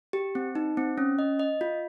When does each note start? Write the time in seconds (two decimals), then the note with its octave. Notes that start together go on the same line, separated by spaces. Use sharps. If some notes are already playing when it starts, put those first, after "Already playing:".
0.13 G4
0.35 C4
0.55 D#4
0.77 C4
0.98 C#4
1.19 D#5
1.39 D#5
1.61 F4